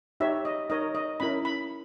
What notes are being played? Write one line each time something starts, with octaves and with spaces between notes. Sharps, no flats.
D#4 G4 C#5 E5
D#5
D#4 A#4 C#5 D#5
D#5
C#4 E4 A#4 B5
B5